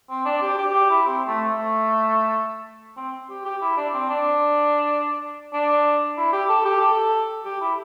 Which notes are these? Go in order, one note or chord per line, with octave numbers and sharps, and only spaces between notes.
C4
D4
G4
G4
G4
E4
C4
A3
A3
C4
G4
G4
E4
D4
C4
D4
D4
E4
G4
A4
G4
A4
G4
E4